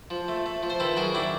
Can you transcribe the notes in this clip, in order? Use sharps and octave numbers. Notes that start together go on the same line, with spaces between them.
F3
A3
A3
F3
C5
D#3 A4 B4
F#3 G#4 A#4
D#3 D4 E4